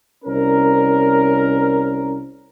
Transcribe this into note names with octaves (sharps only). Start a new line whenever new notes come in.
C2 C#4 A#4